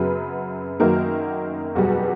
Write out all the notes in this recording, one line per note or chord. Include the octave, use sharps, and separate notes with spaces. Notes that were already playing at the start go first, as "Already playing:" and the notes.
Already playing: F#2 C#3 F#3 B3 B4
F#2 D#3 F#3 A#3 A#4
E2 B2 F#3 G3 F#4